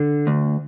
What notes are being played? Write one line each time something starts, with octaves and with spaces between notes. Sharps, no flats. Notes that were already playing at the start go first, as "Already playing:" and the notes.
Already playing: D3
D2